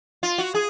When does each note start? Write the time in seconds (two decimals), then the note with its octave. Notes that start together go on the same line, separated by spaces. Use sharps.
0.23 F4
0.38 F#4
0.54 G#4